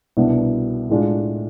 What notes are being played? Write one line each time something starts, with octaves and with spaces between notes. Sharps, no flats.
C2 B2 B3 D4
A2 G#3 D4 F4